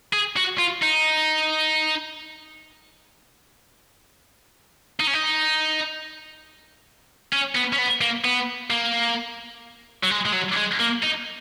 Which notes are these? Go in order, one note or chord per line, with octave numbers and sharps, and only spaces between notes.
G#4
F#4
F4
D#4
D#4
C#4
D#4
C#4
B3
C#4
B3
A#3
B3
A#3
F#3
G#3
G#3
F#3
G#3
A#3
D#4